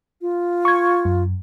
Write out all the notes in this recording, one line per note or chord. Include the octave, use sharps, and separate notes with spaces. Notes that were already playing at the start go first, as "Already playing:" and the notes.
F4
C#6 G#6
F#2